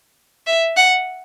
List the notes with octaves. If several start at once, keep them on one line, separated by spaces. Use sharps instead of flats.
E5
F#5